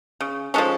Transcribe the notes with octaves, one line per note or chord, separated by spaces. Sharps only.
C#3
F3 G#3 C#4 A4